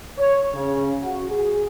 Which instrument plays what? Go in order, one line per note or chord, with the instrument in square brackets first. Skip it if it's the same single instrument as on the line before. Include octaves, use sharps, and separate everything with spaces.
[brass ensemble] C#5
C#3
F#4
G#4